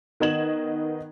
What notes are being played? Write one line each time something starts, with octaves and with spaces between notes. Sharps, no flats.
D#3 B3 D#5 G#6 E7 F#7